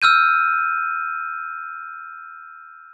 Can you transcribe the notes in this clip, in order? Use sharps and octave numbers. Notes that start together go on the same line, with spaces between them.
E6 F6 G6 D#7